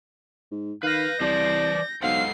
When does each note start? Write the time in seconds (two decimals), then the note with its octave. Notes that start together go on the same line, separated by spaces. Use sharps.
0.51 G#2
0.83 D#3 B4 F5 G6 A#6
1.20 C2 E3 C5 D5 A5
2.03 B1 G#3 A4 C5 F5 F#5 C7